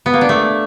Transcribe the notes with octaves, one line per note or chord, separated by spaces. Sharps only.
B3
A#3
D4
A3